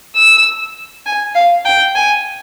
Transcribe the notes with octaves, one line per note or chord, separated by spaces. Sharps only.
E6
G#5
F5
G5
G#5